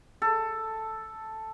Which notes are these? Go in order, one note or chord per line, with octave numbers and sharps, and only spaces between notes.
A4